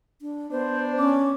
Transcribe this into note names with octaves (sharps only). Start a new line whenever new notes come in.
D4
B3 D4 C5
C#4 D6